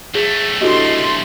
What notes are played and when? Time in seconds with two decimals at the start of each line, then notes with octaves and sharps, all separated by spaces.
0.15 B1 A3 G#4
0.61 D3 E4 F#4 G4 D#5 C6